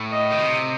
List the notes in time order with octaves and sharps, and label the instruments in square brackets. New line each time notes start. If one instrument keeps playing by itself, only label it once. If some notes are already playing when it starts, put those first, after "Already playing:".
Already playing: [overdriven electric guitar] A2
[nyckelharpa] D#5
[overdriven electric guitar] D#3
C3